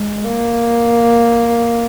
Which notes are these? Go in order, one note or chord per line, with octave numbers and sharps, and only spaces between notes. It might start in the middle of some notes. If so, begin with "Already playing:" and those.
Already playing: G#3
A#3